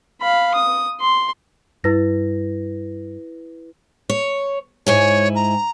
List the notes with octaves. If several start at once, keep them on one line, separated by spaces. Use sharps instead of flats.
F5 B5
D#6
C6
G2 E4 B4 A#6
C#5
G#2 E4 C#5 G#5
A#5